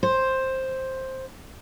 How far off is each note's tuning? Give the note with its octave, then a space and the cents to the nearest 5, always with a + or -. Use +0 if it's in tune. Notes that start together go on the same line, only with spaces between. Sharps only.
C5 +10